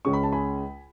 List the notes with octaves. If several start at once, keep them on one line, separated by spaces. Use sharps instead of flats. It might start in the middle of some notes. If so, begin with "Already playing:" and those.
C#2 C#3 G#3 C#4 C#6
B5
A5
G#5 B5